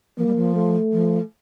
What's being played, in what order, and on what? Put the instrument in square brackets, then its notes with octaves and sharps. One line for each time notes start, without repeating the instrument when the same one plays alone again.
[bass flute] F3 [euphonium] A#3
[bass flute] G3
F3
[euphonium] A3
[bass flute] F3